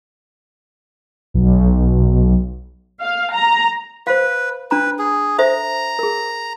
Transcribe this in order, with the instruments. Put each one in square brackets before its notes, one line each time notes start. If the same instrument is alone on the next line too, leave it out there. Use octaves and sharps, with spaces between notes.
[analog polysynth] B1
[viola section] F5
A#5
[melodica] B4 [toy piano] C5 F5
[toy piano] D4 A#5 [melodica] B4
[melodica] G#4
[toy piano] A4 C5 E5 [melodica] A#5
[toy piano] G#4 A#4